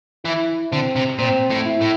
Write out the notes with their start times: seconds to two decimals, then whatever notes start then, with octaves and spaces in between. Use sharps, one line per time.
0.25 E3 E4
0.72 D3 C4
0.96 C3
1.19 A#2 C4
1.50 A2
1.66 E4
1.81 A2